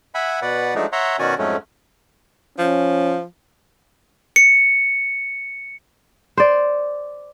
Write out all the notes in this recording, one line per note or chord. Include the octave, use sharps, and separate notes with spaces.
E5 F#5 G#5 B5
B2 B4 D5 F#5
F3 F#3 G#3 A3 D4 D#4
C#5 E5 F#5 A#5 C6
B2 D#3 C#4 F#4 D5 G#5
F2 G#2 F#3 G#3 A3 C#4
F3 C#4
C#7
C5 D5